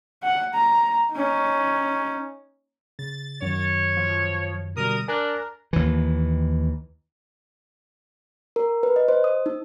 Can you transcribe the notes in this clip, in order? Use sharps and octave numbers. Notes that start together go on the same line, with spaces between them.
F#5
A#5
C#4 D#4
C#3 A6
F#2 D#3 C#5
F3
B2 D3 G3 A#4 D#6
D4 A#4 G#5 F#6
D#2 E3
A#4
B4
D#5
C5
D#6
D#4